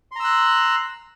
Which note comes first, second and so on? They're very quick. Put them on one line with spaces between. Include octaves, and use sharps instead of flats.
C6 A#5 E6 F#6